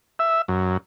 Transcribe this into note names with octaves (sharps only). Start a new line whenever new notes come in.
E5
F#2